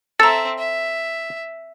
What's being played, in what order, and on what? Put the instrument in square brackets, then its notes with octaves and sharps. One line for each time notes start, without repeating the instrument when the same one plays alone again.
[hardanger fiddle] C4 E5 [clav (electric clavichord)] A4 [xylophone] A#5 E6
[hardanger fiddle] E5